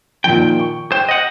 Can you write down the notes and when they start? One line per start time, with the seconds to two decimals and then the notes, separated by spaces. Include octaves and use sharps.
0.24 A#2 D#3 F3 G5
0.59 C#6
0.92 C5 G5
1.09 D#5 F#5